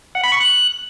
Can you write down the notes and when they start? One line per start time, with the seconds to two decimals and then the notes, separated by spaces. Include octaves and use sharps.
0.15 F#5
0.23 B5
0.32 C#6
0.40 F#6